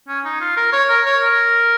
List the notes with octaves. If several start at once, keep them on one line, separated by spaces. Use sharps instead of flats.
C#4
D#4
F4
A#4
C#5
A#4
C#5
A#4